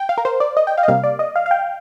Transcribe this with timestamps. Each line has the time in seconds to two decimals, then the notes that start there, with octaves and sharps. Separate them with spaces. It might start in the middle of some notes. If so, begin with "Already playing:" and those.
Already playing: G5
0.09 F5
0.18 A#4
0.25 C5
0.40 D5
0.57 D#5
0.67 G5
0.78 F5
0.83 D#5
0.88 C3 G3 A#3 F5
1.04 D5
1.19 D#5
1.36 F5
1.46 F5
1.51 G5